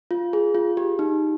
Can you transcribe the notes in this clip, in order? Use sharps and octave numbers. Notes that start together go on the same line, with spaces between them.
F4
G#4
F4
G4
D#4